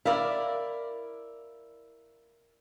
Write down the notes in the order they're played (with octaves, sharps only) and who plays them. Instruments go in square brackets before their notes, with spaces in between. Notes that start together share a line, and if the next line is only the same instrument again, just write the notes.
[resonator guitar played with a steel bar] E4 A#4 D5 [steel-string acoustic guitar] F5